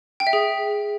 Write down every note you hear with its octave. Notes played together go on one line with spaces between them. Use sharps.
G5
E5
G#4